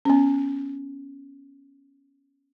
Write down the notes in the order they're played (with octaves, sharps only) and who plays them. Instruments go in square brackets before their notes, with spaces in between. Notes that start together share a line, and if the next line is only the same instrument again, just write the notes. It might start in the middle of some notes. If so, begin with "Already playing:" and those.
[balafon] B3 C#4